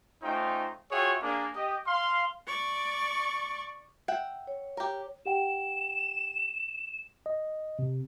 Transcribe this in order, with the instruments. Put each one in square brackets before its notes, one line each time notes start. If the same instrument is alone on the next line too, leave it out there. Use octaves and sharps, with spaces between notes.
[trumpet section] A3 C#4 D#4 F4 C5 G5
F4 F#4 G#4 C#5 E5 G5
A#3 D4 G#4
G4 D#5
F5 C6
[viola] D5 C#6
[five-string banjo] E5 F#5 G5
[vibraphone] C#5
[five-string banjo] G4 A#4
[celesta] G4 F#5 G5 [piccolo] E7
[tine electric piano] D#5
C3